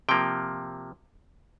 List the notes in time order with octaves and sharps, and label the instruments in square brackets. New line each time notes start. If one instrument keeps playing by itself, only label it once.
[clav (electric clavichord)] C3 F3 A#3 G5